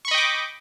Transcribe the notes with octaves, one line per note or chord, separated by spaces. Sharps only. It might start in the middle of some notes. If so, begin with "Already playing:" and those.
D#5 G5 B5 C#6 D6